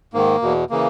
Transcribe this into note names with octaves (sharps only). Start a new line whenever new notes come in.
G#2 D#3 A#3
E2 B2
C#3 E3 A#3